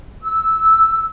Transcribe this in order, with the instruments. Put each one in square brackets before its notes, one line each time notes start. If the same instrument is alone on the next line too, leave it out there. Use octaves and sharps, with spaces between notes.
[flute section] E6